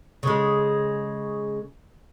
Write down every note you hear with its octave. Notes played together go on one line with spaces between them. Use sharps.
C#3 G#3